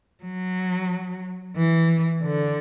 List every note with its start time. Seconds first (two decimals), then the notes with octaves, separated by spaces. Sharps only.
0.24 F#3
1.57 E3
2.23 D3